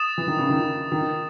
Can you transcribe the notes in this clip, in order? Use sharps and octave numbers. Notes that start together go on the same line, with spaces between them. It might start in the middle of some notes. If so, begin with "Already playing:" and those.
Already playing: D#6 A6 E7
E3
D#3
C#3
D#3
D#3